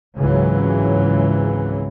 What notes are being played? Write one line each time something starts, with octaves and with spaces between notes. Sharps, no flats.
G#1 C#2 G#2 C#3 E3 F#3